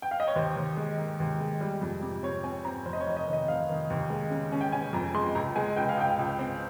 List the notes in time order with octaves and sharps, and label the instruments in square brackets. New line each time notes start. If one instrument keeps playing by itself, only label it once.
[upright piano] G5
F5
D#5
C#5
D#2 C5
D#2
G#3
D#3
D#2
G#3
G3
F2
C3
C4 C#5
C4 G#5
C4 A#5
F1 C5
D#5
C#5
F1
D#5
D#3
D#5
F1 F5
D#3
D#2
G#3
C#3
C#4
G5
C#4 G#5
F2 A#5
G#3 C6
C#2 A#5
G#3 G#5
C#2 G5
F5
C#2 G5
C#2
C4